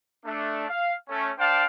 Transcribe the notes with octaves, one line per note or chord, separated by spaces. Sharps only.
A3 D4
F5
A3 C#4
D4 C5 D5 F5 G5 A5